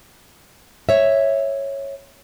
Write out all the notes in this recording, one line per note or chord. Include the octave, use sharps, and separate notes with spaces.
C#5 E5